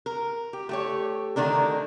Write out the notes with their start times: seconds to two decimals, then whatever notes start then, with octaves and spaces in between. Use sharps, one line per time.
0.06 A#4
0.53 G4
0.69 A3 G4 C#5
1.36 D3 D#3 A3 D4 A#4